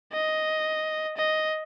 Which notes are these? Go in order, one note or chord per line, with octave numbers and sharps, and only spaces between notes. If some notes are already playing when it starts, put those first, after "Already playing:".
D#5
D#5